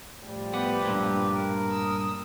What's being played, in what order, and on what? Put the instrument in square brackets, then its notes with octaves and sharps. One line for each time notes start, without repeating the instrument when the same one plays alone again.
[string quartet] A2 F3 G3
[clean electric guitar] B3 [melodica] G4 B4
[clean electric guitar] G2 A#2
[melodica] A#4
[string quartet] D#6 E6